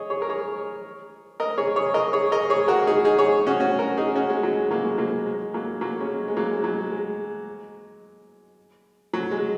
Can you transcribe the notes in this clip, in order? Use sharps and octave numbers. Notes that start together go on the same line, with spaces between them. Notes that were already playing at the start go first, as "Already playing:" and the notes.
Already playing: G#4 C#5 D#5
G#4 C#5
A#4
G#4 C#5
A#4 D#5
G#4 C#5
G#4 C#5
A#4 D#5
G#4 C#5
A#4 D#5
G#4 C#5
F#4 A#4
D#4 G#4
D#4 G#4
G#4 C#5
C#4 F#4
C#4 F#4
F#4 A#4
D#4 G#4
C#4 F#4
G#3
F#3
G#3
F#3 A#3
G#3
F#3 A#3
G#3
F#3 A#3
F#3 A#3
G#3 C#4
G#3
F#3 A#3
G#3
F#3
G#3
G#3
F#3
G#3